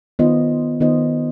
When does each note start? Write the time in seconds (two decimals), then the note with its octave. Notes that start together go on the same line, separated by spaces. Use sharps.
0.19 D#3 B3 F4 C5 D#5
0.81 D#3 B3 F4 C5 D#5